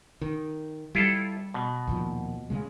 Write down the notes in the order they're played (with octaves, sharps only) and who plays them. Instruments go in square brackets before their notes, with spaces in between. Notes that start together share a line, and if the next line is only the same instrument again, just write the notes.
[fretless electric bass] D#3
[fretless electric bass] G3 [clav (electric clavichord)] E4 F4 A4
[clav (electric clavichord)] B2
[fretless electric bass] D#2 A#2 F3
C#3 G#3